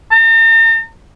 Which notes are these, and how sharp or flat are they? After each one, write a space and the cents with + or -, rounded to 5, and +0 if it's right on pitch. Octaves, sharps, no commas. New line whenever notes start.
A#5 -45